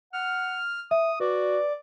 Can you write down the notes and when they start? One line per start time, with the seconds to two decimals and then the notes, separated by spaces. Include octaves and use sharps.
0.13 F#5 F6
0.91 E5 D#6
1.20 F#4 B4 D5